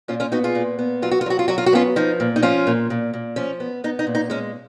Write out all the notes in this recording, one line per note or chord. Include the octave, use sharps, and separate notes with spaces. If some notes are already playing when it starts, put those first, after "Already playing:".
A#2 C#4 F4
C#4 F4
B3 D#4 F#4
F4 G#4
A#2
B3
F#3 F4
F#4
F4
F#3 F#4
F4
F#3 F#4
F4
F#4
B3 C#4 F4
F3 D#4
A#2
D#4
F3 C#4 F4
A#2
A#2
A#2
F3 C#4
B3
B3 D#4
D#4
A#2
D#4
G#3 C#4